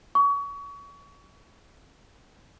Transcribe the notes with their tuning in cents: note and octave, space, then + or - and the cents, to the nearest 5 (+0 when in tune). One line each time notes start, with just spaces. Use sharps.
C#6 +30